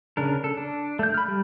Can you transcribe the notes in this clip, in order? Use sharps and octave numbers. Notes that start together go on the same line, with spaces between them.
C#3 D4 A#4
A4
D4
A3 G6
B5 F6
G3